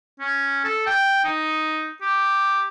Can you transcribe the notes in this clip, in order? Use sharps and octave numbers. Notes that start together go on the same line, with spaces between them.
C#4
A4
G5
D#4
G4